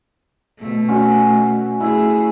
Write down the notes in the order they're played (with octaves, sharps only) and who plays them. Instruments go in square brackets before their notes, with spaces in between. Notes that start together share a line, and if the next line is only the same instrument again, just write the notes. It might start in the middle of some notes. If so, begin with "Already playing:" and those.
[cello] B2 A3
[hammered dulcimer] C#4 F#4
[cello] A3 G#4 [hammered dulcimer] E4